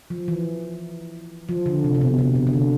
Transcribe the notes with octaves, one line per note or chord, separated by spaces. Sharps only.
F3
E3
F3
D3
C3
C3
B2
C3
B2
D3
C3